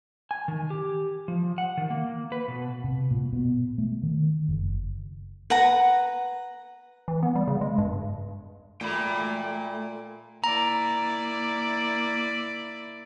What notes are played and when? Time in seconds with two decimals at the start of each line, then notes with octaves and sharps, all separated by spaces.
0.31 G#5
0.48 D#3
0.70 G4
1.28 F3
1.58 F#5
1.77 D#3
1.90 A#3
2.32 B4
2.48 B2
2.84 C3
3.11 A#2
3.33 B2
3.78 A3
4.03 D#3
4.48 F#1
5.50 B4 F#5 A#5
7.08 E3
7.23 B3
7.35 G3
7.47 C#3
7.61 G#3
7.78 G2
8.81 A#2 A3 G5 B5
10.44 A#3 E4 D5 A#5